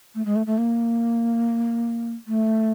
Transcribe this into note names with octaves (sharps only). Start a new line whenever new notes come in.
A3
G#3
A3
A3
A#3
A3